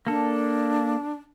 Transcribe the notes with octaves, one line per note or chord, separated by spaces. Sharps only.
A#3 D4 A4